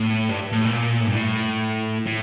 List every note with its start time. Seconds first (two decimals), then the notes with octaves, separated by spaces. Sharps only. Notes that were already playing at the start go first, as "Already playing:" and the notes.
Already playing: A2
0.29 G2
0.52 A2
0.65 A#2
1.00 A2
1.07 G2
1.15 A2
2.07 A2